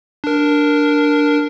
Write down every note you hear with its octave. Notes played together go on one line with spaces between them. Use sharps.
D4 A#4